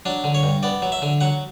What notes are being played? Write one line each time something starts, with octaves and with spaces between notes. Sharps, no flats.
F#3 D4
D3
C#5
G2
B3 D5
F#3
E5
D3
F#3 F#5